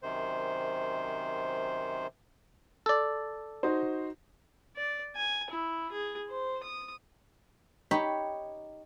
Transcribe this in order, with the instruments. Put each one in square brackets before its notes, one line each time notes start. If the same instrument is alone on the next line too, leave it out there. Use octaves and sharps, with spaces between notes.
[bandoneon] F#2 C3 D#3 C5
[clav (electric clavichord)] A4 D5
[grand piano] D#4 F#4 C5
[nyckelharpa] D5
G#5
E4
G#4
C5
D#6
[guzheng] D#4 G4 C#5 B5